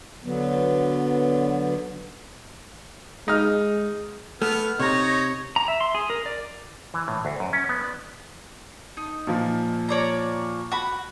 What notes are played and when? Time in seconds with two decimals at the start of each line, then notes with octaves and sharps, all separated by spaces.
0.24 D3 F#3 B3
3.28 G#3 D#4 F6
4.42 A3 B3 F6
4.80 C3 D#4 C#5 A#6
5.56 A#5
5.68 E5
5.81 C6
5.95 G#4
6.10 A#4
6.26 D5
6.94 E3
7.08 A2
7.25 D2
7.40 F#2
7.53 C#4
7.69 B3
7.84 D5
8.97 D#4
9.27 A#2 F3
9.89 C#5 D5 A#5
10.72 F#4 B5